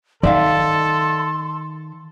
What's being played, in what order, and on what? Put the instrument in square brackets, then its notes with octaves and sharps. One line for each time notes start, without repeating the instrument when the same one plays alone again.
[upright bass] D#3 [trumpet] A4 [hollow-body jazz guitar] D5 E5 F5 [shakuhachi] C6